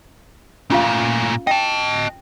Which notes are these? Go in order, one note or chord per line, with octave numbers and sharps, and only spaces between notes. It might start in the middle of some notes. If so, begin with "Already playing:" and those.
A#2 A3 C#4 F4 F5
D#5 G5 A5